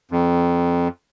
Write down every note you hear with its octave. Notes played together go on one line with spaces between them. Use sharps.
F2